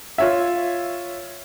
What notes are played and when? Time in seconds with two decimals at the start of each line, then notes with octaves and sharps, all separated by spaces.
0.18 F4 C#5 E5